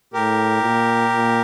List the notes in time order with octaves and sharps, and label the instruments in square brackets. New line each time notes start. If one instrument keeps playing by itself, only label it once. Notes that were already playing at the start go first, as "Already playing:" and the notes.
[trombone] A2 [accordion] G4 A#4
[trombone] A#2
A#2